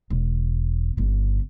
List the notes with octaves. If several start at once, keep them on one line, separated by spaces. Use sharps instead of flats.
E1
G1 C#3